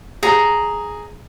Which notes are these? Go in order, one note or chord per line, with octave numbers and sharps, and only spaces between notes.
G#4 A#5